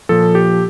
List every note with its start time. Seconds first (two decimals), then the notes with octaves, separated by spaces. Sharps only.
0.09 A#2 F3 A4
0.35 G4